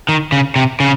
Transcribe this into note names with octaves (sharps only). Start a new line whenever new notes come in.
D#3
C#3
C3
C#3